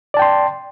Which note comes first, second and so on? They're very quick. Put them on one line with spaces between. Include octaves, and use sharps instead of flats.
D5 A5 G5 C6